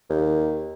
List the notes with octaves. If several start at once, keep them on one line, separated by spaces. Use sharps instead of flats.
D#2